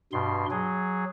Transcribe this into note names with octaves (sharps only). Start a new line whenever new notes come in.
G2 B2 C6
F#3 G#4